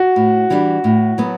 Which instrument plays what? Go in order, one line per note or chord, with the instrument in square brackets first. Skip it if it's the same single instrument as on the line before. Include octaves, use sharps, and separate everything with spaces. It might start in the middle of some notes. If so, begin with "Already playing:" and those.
Already playing: [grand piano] F#4
[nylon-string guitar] A2
E3 G3 D4 G4
A2
F#3 B3